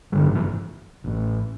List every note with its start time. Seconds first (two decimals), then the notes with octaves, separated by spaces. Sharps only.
0.12 A1 G2 D3 G3
0.24 F#3
0.31 D3
0.35 E3
1.04 A1 A2